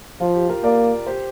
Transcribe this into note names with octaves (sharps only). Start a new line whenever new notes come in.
F3 F4
G4
F4 A#4
A#3 A#4 D5
G4 C5